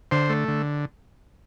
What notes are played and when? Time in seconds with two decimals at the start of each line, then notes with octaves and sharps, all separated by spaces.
0.11 D3 C5
0.29 A3
0.48 D3